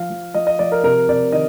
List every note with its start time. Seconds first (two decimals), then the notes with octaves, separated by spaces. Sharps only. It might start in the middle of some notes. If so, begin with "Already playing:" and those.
Already playing: F3 F5
0.10 F3
0.34 F3 D#5
0.47 D#5
0.59 F3 D5
0.72 A#4
0.84 C3 A#4
1.08 C3 D5
1.32 D#3 D#5